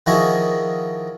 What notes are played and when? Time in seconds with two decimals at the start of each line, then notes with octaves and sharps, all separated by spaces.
0.06 D#3 F3 E4 F#4 G#4 D#5